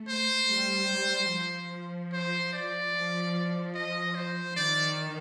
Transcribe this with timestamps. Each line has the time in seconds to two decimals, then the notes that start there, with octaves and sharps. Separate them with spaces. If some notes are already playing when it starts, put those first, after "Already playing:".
Already playing: A3
0.09 C5
0.50 G3
0.91 G3
1.32 F3
2.13 C5
2.53 D5
2.93 F3
3.75 D#5
4.15 C5
4.56 D#3 D5